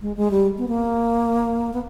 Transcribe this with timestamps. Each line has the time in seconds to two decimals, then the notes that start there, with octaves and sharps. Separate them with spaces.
0.01 G#3
0.17 G#3
0.31 G3
0.58 B3
0.68 A#3
1.73 B3